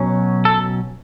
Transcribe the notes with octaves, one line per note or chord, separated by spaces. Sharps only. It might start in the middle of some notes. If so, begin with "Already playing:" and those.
Already playing: B2 F#3 C#4
A4